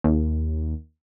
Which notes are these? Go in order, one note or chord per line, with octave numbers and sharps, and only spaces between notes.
D#2